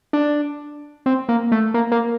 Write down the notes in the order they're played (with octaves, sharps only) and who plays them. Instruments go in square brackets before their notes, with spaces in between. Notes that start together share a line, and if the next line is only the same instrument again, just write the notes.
[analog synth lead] D4
C4
A#3
A3
A#3
A#3